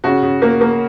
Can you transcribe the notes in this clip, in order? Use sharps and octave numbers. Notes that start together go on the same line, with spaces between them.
C#3 F#4
C#3
A#3
A#3